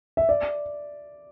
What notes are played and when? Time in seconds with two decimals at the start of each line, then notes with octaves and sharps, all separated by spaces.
0.17 E5
0.29 D5